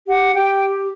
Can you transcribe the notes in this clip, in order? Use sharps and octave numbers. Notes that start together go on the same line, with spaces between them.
G4 F#5
G4 G5